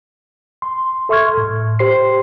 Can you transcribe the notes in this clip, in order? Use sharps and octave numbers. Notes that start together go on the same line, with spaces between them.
C6
A4 E5 C6 C#6 F6 G#6
A2
G4 C5 C6 C7